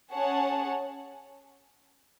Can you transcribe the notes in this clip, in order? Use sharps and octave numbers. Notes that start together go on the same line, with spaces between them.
C#4 G#4 C#5 F#5 A5